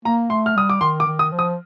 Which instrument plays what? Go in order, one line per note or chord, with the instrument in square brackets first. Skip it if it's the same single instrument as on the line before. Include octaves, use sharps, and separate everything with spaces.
[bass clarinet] A#3 [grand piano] A#5
[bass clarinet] A3 [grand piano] C6
[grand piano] F6
[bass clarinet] G3 [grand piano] D#6
[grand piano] D6
[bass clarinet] D#3 [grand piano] C6
[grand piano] D6
[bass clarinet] D#3
[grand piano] D#6
[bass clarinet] F3
[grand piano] D#6